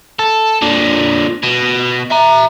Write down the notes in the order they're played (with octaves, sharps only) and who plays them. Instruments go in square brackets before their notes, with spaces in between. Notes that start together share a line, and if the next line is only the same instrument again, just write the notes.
[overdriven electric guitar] A4
A#2 D3
B2
E5 A#5